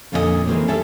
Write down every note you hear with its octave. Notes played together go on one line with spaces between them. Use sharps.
F2 A#2 D3 C#4 F4 D#5
D#3 E3 F#3 G#3 A#3 C4
G3 C#4 G#4 A4 E5